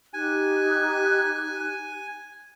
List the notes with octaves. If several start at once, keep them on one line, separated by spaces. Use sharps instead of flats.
D#4 G4 G#5 F#6